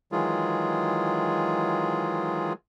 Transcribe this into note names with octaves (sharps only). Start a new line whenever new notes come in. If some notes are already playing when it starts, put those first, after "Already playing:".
D#3 E3 F#3 G#3 F4 G#4